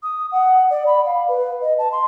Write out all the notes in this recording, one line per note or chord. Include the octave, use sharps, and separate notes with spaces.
D#6
F#5
D5
B5
F5
B4
D#5
A5
C6